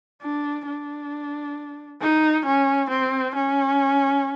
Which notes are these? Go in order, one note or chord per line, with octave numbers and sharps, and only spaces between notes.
D4
D4
D#4
C#4
C4
C#4